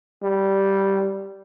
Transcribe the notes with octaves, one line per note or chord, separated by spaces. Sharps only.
G3